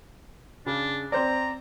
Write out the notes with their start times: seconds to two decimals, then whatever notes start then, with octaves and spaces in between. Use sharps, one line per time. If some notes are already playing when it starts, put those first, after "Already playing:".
0.66 C#3 D4
1.12 C4 C5 D5 A#5